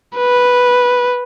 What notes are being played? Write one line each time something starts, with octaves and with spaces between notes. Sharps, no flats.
B4